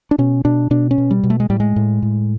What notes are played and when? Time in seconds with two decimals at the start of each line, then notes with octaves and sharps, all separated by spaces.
0.11 D4
0.18 B2 C#4
0.45 B2 D4
0.71 B2 D4
0.91 C#4
0.98 B2
1.11 G3
1.23 B2
1.30 A3
1.40 G#3
1.50 A2 G3
1.60 G#3
1.76 A2
2.02 A2